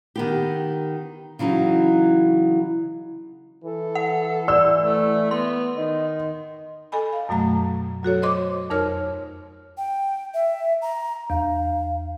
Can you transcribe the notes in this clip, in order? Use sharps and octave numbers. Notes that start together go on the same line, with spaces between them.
D#3 B3 G4
C#3 E3 F#3 D#4
E3 A4
F#5
D5 E6
A3
B3 C6
D#3 D#5
A4 D#5 G#5 B5
F5
F#2 B2 F#3 A3 A#5
F#3 F#4 A4 C#5
C5 D#5 C6 D6
F2 D#4 A#4 C#5 F6
G5
E5
A#5
E2 F5